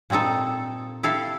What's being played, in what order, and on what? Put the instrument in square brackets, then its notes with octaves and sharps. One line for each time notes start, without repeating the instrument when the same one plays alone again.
[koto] A#2 G3 C4 D#4 A4
E4 G4 A4 E5 F5